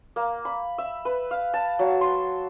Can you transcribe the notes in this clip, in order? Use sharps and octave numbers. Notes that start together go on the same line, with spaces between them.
A#3
B5
E5
B4
F5
A5
F#3
C6